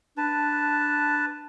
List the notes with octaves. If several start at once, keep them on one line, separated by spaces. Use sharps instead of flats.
D4 B4 A5